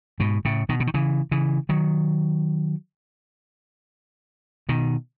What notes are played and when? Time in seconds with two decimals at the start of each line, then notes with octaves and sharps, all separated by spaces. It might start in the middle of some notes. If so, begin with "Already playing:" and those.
0.20 G#2 B2
0.45 A2 C#3
0.69 B2 D#3
0.80 C#3
0.87 D#3
0.94 C#3 E3
1.31 C#3 E3
1.69 D#3 F#3
4.69 B2 D#3